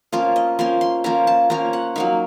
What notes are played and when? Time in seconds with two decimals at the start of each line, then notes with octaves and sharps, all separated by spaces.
0.12 F3 A#3 C#4 F4
0.36 D#5
0.59 F3 A#3 C#4 C6
0.81 C6
1.04 F3 A#3 C#4 A#5
1.27 A5
1.50 F3 A#3 C#4 A#5
1.73 F#5
1.96 F#3 A#3 D#4 F5